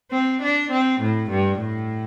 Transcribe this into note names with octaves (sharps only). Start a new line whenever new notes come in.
C4
D4
C4
A2
G2
A2